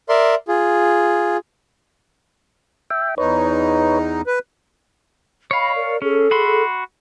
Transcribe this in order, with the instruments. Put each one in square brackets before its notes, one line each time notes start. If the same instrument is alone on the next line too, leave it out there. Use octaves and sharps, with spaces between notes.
[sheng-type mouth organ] A#4 D5 E5 C6
F4 G#4
[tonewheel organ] E5 G5
[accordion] E2 D#4 [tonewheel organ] B4 C#5
[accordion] B4
[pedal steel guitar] C#5 F5 [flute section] D#5 B5
[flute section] A#4 D5
[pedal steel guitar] C#4 [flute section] G#4 A4
[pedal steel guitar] F#4 B5 C6